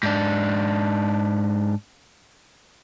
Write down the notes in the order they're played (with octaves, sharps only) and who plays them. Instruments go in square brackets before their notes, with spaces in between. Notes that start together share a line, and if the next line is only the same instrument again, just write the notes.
[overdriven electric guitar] G#2 D4